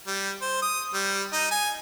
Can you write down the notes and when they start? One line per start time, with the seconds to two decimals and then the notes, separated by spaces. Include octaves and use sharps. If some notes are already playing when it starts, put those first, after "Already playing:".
0.07 G3
0.41 C5
0.62 D#6
0.94 G3
1.33 D#4
1.51 G#5